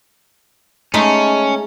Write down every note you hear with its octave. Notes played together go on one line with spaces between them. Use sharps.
G#3 A3 C#4 D#4